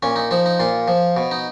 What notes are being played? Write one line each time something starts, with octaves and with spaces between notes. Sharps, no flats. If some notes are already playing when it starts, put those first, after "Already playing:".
A#2 C#4
D#4
F3 D#4
D#4
A#2 F4
F3
B2
D#4